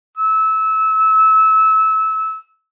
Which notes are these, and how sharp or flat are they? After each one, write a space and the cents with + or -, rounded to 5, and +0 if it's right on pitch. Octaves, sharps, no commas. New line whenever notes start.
E6 -25